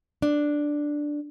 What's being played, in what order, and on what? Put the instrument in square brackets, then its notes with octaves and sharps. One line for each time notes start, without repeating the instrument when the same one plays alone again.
[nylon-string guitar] D4